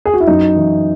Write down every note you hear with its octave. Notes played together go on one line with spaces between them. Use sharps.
G#4
F#4
E4
F#2 D#4
E3